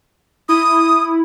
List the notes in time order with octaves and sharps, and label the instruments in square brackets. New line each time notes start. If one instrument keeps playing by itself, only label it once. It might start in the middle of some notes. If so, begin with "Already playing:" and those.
[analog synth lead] E4 [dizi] D#6